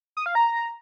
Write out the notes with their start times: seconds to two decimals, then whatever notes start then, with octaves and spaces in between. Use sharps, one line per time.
0.17 D#6
0.26 F5
0.35 A#5